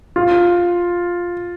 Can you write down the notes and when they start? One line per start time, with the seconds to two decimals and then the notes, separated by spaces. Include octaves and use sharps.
0.16 F4